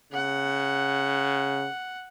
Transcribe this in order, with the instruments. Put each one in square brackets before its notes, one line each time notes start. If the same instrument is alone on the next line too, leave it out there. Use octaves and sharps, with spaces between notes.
[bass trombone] C#3 [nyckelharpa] F#5